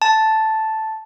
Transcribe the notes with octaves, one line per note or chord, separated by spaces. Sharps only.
A5